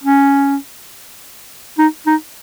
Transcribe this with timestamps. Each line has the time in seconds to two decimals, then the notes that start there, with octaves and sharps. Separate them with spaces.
0.04 C#4
1.79 D#4
2.07 D#4